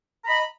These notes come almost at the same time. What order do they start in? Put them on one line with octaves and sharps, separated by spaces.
A#5 B5 D#5